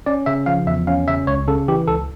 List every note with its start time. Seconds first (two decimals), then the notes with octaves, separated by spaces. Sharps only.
0.06 C#4 D5
0.26 C#3 E5
0.46 F3 F5
0.67 E2 E5
0.87 C#4 F5
1.07 C#3 E5
1.27 C#2 C#5
1.47 C#3 A4
1.68 E3 G4
1.88 C#2 A4